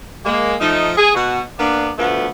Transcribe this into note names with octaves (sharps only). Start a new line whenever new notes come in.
G#3 A#3
F3 A3 D#4
G#4
B2 F#4
A#3 B3 D4
D2 F3 A3 B3